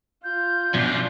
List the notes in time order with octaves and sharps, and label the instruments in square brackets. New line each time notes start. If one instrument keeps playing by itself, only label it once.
[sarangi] F4 [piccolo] G6
[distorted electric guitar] F#2 F4 [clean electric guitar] B2 F3 [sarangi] D4